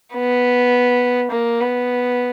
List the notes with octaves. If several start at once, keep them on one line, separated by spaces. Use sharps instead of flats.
B3
A#3
B3